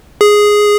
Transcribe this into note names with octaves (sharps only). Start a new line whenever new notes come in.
G#4